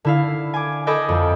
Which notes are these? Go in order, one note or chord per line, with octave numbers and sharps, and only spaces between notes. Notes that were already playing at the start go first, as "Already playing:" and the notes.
D3 E4 F5
G#5 D6
A4 D#5 G#5 B5 D6 G6
F2